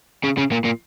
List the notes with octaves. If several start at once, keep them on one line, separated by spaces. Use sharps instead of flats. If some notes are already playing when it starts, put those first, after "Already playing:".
C#3
C#3
A#2
A#2